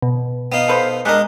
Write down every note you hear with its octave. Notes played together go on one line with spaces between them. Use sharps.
B2
B3 D#4 F5
A4 B4 C5
G3 G#3 D4 A#4 D#5 F#6